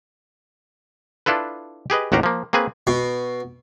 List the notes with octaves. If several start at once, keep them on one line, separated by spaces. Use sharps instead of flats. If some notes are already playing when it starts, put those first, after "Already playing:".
D4 E4 F4 A4 B4
G4 G#4 B4 D#5
A1 D#2 F#4 G4 F5 A#5
F3 A#3
A#3 C4 G#4 B4 G#5
B2